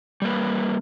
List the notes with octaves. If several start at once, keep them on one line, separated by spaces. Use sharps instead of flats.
G3 A#3 B4